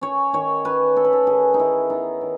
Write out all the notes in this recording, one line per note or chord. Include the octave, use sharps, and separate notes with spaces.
C#4 C#5
D#3 C#5
C#4 B4
C#4 A4
B4
A4
D#3 G#4
D#4
D#3 E4
B3 D#4
D#3